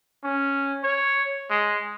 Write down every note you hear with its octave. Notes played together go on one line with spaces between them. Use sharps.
C#4
C#5
G#3